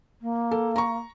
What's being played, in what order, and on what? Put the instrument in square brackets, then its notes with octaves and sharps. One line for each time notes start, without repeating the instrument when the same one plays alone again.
[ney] A#3
[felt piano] A4
A#5 C#6